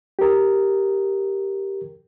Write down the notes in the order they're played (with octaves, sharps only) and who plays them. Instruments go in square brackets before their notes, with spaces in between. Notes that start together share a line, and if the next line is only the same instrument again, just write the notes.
[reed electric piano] G4 A#4